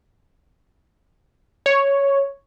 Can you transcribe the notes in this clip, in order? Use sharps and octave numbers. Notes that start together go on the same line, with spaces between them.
C#5